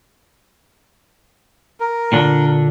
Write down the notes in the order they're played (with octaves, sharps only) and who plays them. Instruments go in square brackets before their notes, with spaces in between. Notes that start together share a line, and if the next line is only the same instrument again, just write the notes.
[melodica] A#4
[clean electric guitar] A#2 D3 D4